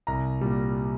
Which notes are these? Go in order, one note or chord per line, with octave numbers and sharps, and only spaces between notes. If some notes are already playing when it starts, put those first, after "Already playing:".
C2 A#5
A#2 G3